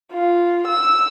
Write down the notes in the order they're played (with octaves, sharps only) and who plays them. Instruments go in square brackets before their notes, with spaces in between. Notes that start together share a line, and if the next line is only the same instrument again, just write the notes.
[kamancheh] F4
E6